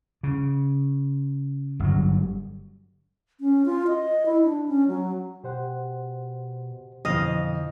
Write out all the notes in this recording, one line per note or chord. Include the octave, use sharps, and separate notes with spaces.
C#3
G1 F#3
C#4
F4
D#5
E4
D4
C#4
F#3
B2 G4 C5 F#5
F2 B2 D3 E3 D#5 F5